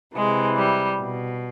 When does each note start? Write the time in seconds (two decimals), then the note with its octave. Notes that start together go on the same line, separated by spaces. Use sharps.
0.15 C3 E3 G#3
0.58 G3
1.00 B2